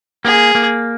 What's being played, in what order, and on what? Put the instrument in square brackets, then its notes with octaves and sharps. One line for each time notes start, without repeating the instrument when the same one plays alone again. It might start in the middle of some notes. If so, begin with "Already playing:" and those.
[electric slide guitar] A#3 [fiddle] G#4
[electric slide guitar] A#3